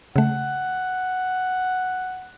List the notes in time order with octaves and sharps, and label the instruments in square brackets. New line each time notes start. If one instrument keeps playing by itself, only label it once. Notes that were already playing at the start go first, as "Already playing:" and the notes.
[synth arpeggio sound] C#3 A3 [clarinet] F#5